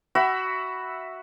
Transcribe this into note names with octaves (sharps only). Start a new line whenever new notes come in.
F#4 E5 B5